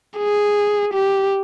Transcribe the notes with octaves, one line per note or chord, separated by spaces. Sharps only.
G#4
G4